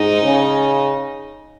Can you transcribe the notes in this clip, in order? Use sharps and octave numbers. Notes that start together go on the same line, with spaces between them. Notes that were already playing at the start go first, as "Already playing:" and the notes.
Already playing: G#2 D#4
C#3